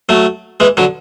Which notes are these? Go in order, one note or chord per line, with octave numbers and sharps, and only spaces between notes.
F#3 A3
E3 G#3
D3 F#3